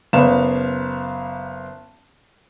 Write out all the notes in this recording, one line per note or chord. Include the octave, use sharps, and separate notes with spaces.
F#1 B3 F5 E7